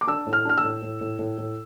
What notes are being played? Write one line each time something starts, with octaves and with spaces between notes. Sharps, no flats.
D6
D4 E6
A2
F6
D4 F6
E6
A2
A2
A2
A2
A2